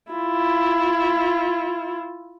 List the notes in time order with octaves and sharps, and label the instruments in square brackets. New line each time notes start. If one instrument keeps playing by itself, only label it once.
[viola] E4 F4